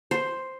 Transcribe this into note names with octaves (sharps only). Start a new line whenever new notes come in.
C5